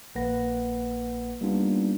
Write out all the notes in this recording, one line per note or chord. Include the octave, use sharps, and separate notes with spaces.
A#1 A#3 B4 F#5 A#6
G3 A#3 B3 D4 D#4 F4